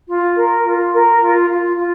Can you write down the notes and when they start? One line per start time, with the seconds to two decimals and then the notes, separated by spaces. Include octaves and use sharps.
0.09 F4
0.36 A#4
0.65 F4
0.93 A#4
1.21 F4
1.49 F4
1.77 F4